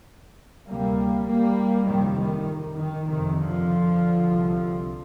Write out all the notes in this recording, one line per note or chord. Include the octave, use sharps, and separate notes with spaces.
D2 C3 G3 A#3
G3 A#3
F2 C3 D#3 G3
D#3
D#3
F2 C3 D#3
D3 F3
C2 C3